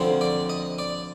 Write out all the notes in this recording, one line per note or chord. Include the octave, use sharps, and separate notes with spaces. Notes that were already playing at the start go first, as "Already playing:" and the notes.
Already playing: D2 D3 F3 C4
D5
D#5
D5